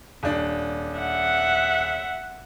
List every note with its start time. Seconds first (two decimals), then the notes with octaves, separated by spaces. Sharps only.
0.23 D#1 D4
1.00 E5 F#5